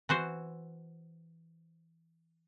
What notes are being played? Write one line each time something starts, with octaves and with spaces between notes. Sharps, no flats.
E3 F#4 C5